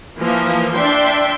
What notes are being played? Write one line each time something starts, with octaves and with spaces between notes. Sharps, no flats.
E3 F3 A#3
D4 E5 G5 C6